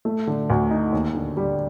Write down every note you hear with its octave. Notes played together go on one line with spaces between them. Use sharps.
A3
D3
D2
D#4
D#2
D3
G3